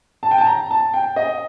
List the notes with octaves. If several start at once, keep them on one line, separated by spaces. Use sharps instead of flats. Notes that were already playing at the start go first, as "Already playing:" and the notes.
A5
G5
A5
A#5
A5
G5
D#5